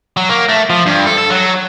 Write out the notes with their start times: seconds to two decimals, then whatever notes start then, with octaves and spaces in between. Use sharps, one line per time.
0.17 F#3
0.29 A#3
0.49 A3
0.70 F3
0.86 G2
1.06 A4
1.18 A4
1.30 F#3